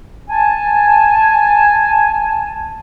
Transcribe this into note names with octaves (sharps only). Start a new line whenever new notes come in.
G#5 A5